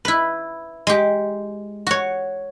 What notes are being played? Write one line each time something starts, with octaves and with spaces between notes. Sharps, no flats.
E4 B4
G#3 G4
F#4 C#5